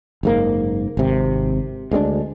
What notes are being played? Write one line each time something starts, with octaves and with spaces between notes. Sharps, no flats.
F#1 G#2 A#3
G#1 C3
D2 G#3 C4 D4